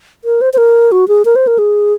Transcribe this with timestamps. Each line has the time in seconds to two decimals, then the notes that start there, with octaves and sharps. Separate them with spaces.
0.24 A#4
0.41 C5
0.53 C5
0.58 A#4
0.92 F#4
1.08 G#4
1.25 A#4
1.36 C5
1.47 A#4
1.58 G#4